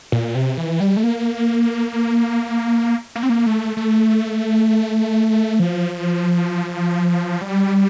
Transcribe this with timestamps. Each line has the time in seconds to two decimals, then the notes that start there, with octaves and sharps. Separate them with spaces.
0.12 A#2
0.35 C3
0.57 E3
0.80 G3
0.97 A3
1.03 A#3
3.15 A#3
3.23 C4
3.29 A#3
3.46 A3
3.77 A3
5.60 F3
7.41 G3